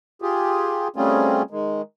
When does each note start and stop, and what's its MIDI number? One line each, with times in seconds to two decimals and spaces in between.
0.22 0.88 65
0.22 0.88 67
0.22 0.88 68
0.96 1.42 55
0.96 1.42 57
0.96 1.42 60
0.96 1.42 61
0.96 1.42 65
0.96 1.42 68
1.51 1.82 51
1.51 1.82 56